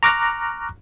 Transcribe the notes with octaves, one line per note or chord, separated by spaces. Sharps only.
A#5 C#6 D6 F6 F#6 A#6